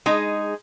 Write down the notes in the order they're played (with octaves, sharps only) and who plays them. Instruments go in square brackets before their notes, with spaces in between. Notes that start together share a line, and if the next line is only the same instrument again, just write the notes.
[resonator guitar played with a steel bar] G#3 D#4 G#4